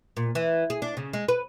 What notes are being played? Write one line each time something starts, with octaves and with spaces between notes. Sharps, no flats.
A#2
E3
G#4
D4
C#3
G#3
B4